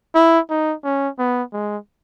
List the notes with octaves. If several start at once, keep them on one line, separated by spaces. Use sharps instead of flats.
E4
D#4
C#4
B3
G#3